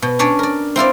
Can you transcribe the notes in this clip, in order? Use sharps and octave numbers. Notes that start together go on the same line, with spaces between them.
B2
C#4 D4 C#5 D5
A#4 D5
C4 E4 F4 D5